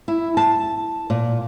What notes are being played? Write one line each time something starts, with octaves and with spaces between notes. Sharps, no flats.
E4
A5
A#2